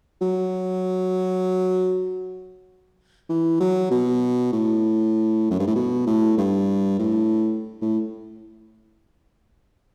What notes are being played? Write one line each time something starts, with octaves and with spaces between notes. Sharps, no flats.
F#3
E3
F#3
B2
A2
F#2
G2
A2
B2
A2
G2
A2
A2